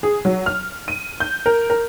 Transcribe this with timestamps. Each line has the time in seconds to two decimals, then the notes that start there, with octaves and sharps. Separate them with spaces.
0.03 G#4
0.25 F#3
0.46 F6
0.88 D#7
1.20 G6
1.46 A#4
1.70 A#4